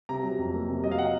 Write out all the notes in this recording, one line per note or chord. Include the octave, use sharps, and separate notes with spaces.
C3 A#5
F#3
F2
A#3
C3
F#3 D#5
F5
C3 F#5